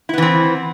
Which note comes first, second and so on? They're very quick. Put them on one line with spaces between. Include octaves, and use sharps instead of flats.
E4 B3 E3 C4